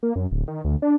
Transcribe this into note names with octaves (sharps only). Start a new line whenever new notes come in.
A#3
F#2
D1
D#3
D2
D4